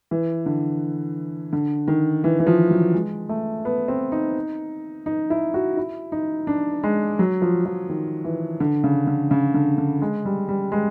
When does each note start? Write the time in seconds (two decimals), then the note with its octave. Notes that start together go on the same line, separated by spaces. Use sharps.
0.11 E3
0.46 D3
1.53 D3
1.88 D#3
2.24 E3
2.40 E3
2.47 F3
2.70 F#3
2.94 G#3
3.29 A3
3.65 B3
3.88 C4
4.12 D#4
5.06 D#4
5.30 E4
5.54 F#4
5.77 E4
6.12 D#4
6.47 D4
6.84 G#3
7.19 F#3
7.42 F3
7.66 F3
7.89 D#3
8.25 E3
8.60 D3
8.84 C#3
9.07 D3
9.31 C#3
9.54 D3
9.78 D3
10.02 G#3
10.25 G3
10.49 G3
10.72 G#3